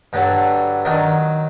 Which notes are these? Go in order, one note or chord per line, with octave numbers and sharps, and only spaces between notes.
G2 D3 F#3
D#3 F#3 D4